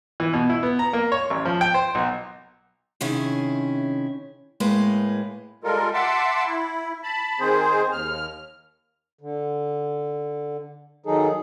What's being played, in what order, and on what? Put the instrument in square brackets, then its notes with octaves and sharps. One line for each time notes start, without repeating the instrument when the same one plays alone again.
[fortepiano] E3
B2
E4
B3
A#5
A#3
C#5
A1
F3
G5
C5
B1
[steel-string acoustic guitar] C3 D#3 C#4 E4 G#4
A2 G#3 A#3 B4
[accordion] G3 G#3 F4 A4 A#4
E5 F#5 A5 C6 D6 E6
E4
A5 B5
D#3 C4 G#4 C5
D#2 F6
[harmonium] D3
D#3 F#3 D#4 G#4 A4